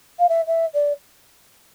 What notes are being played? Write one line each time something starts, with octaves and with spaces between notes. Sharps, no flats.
F5
E5
E5
D5